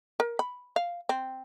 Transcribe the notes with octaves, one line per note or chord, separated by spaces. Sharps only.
A#4
B5
F5
C4